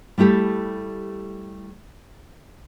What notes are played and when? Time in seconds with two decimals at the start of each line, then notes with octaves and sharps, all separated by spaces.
0.18 G3 A3 E4 G4 A4